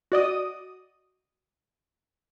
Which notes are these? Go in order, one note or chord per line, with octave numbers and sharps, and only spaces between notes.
F#4 D5 D#5 D#6